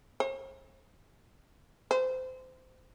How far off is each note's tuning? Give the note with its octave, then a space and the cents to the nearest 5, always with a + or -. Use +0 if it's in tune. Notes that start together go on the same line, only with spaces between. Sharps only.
C5 +40
C5 -25